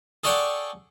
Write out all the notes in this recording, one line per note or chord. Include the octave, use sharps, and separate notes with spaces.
G#4 A4 C#5 D5 F#5 G5